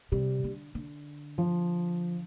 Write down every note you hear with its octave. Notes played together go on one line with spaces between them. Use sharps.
C3 G3
D3
D3
F3